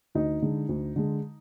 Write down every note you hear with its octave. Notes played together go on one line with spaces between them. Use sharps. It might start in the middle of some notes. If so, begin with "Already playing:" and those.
D2 D#4
D3 G#3
D2
D3 G#3